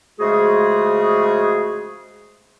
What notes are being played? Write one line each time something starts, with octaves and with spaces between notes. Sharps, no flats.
C#3 F3 G#3 A3 F#4 G#4